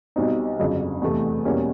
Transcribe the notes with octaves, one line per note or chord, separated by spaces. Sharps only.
B1 B2 G3 C4 D#4
G1 F2 C#3 F#3
E2 C3 E3 A3
E2 B2 G3 A#3 C#4